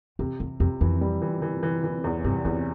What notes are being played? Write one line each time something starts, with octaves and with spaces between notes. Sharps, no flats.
E2 C3
E2 C3
F2 C3
F2 E3
G3
E3
E3
E3
E3
E2
G2 C3
E2 D3